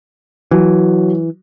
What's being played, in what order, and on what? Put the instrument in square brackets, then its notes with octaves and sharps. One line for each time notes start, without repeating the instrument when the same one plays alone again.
[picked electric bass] E3 [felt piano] F#3